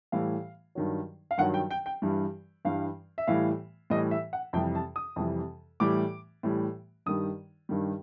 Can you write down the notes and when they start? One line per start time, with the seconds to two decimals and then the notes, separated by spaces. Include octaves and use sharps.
0.12 A2 E3 G3 F5
0.75 G2 D#3 F#3
1.31 F5
1.38 G2 D#3 F#3 F#5
1.54 G5
1.71 G5
1.86 G5
2.02 G2 E3 G3
2.65 G2 E3 G3 F5
3.18 E5
3.27 A2 E3 G3 F5
3.90 A2 E3 G3 D#5
4.11 E5
4.33 F#5
4.53 F2 C3 E3 G3 G5
4.75 A5
4.96 D#6
5.16 F2 C3 E3 G3
5.80 A2 E3 G3 D6
6.43 A2 E3 G3
7.06 G2 D#3 G3 D#6
7.69 G2 D#3 G3